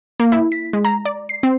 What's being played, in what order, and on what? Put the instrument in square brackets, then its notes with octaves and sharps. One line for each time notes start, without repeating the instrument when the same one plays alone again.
[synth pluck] A#3
E4
B6
G#3
A#5
D5
C7
C4